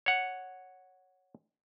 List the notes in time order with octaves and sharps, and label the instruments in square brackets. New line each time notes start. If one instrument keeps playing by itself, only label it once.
[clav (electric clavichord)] C#5 F#5